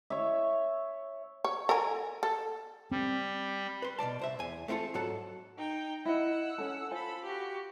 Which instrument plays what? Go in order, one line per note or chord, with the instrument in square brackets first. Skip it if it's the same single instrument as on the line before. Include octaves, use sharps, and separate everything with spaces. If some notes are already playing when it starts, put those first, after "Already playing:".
[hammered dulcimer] C#5 E5
[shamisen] C#5
A4 A#4 G#5
A4
[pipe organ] G3 [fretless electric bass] C4
[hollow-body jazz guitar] B4 C6
B2 D#3 D5 A5
C2 C5 E5
E2 G#5
A3 C4 E4 F4 A4
G#2 F#3 F#4 A4 A5
[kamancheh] D#4 G5
[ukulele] E4 D#5 [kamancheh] F#5 E6
[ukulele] C#4 A4
[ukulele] F4 C5 G#5 [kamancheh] A4 B5
[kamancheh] F#4 G4